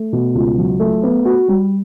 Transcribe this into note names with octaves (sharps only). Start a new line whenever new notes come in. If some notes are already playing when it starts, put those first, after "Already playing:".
Already playing: A3
B2
C#2
F#3
A3
B3
F#4
G3